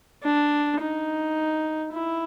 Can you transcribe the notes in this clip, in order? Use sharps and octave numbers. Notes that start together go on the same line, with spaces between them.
D4
D#4
E4